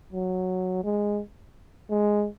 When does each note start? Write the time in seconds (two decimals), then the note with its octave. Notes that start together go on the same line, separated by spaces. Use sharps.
0.13 F#3
0.84 G#3
1.90 G#3